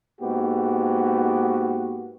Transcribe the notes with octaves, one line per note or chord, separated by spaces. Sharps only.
G#2 A#3 B3 F#4 G4